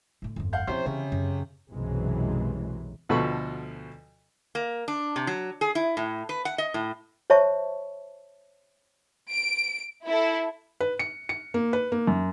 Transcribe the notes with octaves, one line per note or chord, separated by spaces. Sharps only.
A2 D3
G1 F2
F5 F#5 G6
C3 F3 C#4 E4 C5
C#3 E3
F#2
B1 F#2 C3 E3 F#3 G#3
D2 B2 F3 A4 B5 C#6
A#3
D4
C3
F#3
G#4
E4
A2
B4
F#5
D#5
A2
C5 C#5 E5 A5 C#6
D7
E4 A4
B4
C#7
C#7
A#3
B4
A#3
F#2